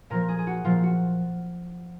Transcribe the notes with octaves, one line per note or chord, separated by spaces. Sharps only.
A#2 F3 A#4
G#4
G#4
F#4
A#2 F3 F4
F#4